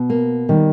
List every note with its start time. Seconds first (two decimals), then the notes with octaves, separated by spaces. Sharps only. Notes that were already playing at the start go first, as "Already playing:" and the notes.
Already playing: B2
0.10 A#3
0.49 D#3 G3